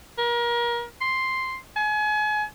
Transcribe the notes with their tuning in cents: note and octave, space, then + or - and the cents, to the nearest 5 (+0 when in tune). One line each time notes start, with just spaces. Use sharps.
A#4 +30
C6 +0
G#5 +35